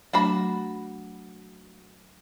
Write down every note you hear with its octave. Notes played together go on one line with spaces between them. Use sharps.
F#3 A3 D4 F#4 A5 B5